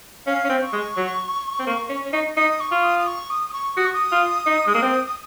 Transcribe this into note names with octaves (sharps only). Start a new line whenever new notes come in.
C#4 F5
C#4
C4
C#6
G#3
F#3
C4
A#3
C#4
C#4
D#4
D#4 D#6
C#6
F4
D#6
D#6
C#6
D#6
D#6
C#6
F#4 D#6
C#6
D#6
F4
D#4
G#3
A#3
C4
D#6